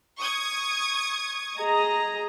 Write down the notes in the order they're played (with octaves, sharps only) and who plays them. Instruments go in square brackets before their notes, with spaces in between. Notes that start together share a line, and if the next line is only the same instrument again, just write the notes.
[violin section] C#6 D#6 G#6
[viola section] G#4 D#5 A#5